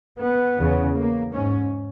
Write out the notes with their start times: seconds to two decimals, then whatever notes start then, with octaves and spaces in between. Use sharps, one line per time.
0.19 B3
0.58 E2 C#3
0.95 A#3
1.32 G#2 C#4